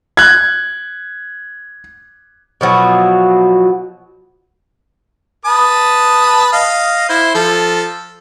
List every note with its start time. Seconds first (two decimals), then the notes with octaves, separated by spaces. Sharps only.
0.17 F#6 G#6
2.61 B2 F3 F#3
5.45 B4 A5 D#6
6.53 D#5 F5
7.09 E4 C5
7.35 F3 A4